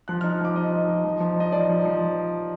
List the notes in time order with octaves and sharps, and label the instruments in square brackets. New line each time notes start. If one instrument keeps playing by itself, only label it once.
[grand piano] F3 F#6
D#4 F6
F3 D6
F3 D#5
D#4
F3
F3
F3
D#4 D#5
F3 D5
F3
F3